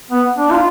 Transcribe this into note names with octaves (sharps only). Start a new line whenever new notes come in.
B3
D4
F4